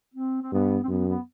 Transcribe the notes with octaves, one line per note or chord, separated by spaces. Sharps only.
C4
C4
G2 B3
C4
F#2 B3
B3